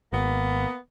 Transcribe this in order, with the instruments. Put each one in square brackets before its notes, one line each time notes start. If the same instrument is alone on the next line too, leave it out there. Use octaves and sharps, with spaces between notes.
[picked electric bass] G#1 [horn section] A#3 B3